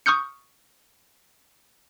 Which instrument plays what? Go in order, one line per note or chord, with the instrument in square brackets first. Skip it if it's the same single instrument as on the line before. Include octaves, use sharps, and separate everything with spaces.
[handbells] C#6 D#6 F6 G6 C#7